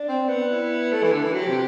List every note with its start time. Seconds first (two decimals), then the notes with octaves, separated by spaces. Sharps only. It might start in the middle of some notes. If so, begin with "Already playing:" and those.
Already playing: D4
0.09 C4
0.29 B3
0.50 E4
0.92 A3
1.03 E3
1.12 D3
1.23 E3
1.33 F#3 G4
1.48 C3